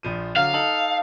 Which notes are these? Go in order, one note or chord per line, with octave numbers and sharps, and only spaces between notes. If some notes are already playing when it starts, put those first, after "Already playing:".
A#1 F3 D#7
D3 F#3 F5
D#4 A4 F#7